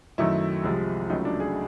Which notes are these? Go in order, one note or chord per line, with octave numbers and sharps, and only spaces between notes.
F#2 D#3 F#3 A3 E4
C2 C3 F3 G#3
C#2 C#3 F#3 A3 D#4
D4
G#4